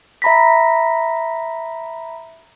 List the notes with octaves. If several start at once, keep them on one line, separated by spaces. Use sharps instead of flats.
E5 A#5 B5 A#6 B6